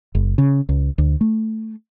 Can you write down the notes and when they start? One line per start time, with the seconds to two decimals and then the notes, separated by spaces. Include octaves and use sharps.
0.15 F#1
0.38 C#3
0.69 C#2
0.98 D2
1.21 A3